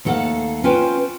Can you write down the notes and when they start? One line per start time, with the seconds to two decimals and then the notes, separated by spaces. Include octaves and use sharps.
0.05 D#2 A3 A4 F5 F#5
0.64 C#4 F4 B4 C5 G5